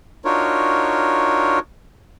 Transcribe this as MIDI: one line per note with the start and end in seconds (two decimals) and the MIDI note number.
0.25 1.59 62
0.25 1.59 63
0.25 1.59 65
0.25 1.59 66
0.25 1.59 70
0.25 1.59 73